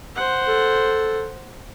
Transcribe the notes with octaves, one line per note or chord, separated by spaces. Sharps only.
C5 F#5
A4